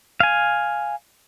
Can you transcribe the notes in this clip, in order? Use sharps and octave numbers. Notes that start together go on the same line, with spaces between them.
F5 G#5